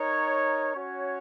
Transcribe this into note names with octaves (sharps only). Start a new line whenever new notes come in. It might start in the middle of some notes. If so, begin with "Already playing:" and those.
Already playing: D#4 A#4 C#5
C#4 F#4 C#5